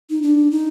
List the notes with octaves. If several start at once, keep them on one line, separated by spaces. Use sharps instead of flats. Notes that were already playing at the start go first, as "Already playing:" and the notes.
D#4
D4
D#4